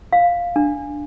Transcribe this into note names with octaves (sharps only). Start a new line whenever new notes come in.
F5
D4